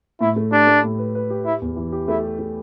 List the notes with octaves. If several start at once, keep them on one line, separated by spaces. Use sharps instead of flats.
A2 E4
A3
D4 G4
A3
A2
B4
B4
G4
E4 G4
E2
E3
G4
A3 E4
G4
A3